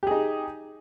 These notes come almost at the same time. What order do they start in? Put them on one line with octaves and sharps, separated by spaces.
G4 G#4 D#4